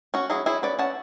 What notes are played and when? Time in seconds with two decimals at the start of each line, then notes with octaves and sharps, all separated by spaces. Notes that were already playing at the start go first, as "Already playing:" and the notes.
0.14 C#4 F#4
0.30 F#3 E4 G#4
0.46 F#3 E4 G#4
0.63 C#4 B4 D5
0.79 C#4 F#5 A5